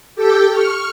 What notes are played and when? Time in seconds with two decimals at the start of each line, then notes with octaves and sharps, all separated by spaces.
0.16 G4 A4 G5
0.50 C#6 F6